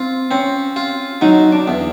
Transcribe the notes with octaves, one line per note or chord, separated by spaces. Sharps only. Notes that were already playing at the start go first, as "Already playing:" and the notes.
Already playing: C4 F4
C4 C#4
F4
F#3 D#4
D4
E2